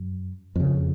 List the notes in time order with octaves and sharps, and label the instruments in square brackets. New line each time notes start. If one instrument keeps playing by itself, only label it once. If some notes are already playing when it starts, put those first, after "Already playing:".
Already playing: [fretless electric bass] F#2
F2 C#3